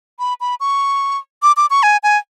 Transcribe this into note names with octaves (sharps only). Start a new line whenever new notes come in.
B5
B5
C#6
D6
D6
C#6
G#5
G#5